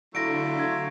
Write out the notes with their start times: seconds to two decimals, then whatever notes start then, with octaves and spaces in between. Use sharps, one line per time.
0.15 D3 F#3 A3 E4 F4 A#6 D7
0.59 G#6